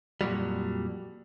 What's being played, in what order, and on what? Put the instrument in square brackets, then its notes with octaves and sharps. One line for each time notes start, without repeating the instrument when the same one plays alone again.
[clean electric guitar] F2 A#2 F#3 G3